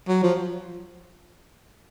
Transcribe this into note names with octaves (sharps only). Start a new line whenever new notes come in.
F#3
F3